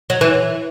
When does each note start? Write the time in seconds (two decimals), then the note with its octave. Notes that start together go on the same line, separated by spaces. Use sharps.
0.10 F#3
0.21 E3